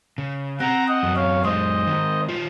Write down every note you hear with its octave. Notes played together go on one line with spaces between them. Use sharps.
C#3
C4 F#5 A#5
D#5 F#5
F#2
C#5 F5
G#3 C5 D#5
D#3
F4